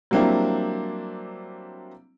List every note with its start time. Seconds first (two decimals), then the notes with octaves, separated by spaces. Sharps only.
0.11 F#3 G3 A#3 C4 D4 E4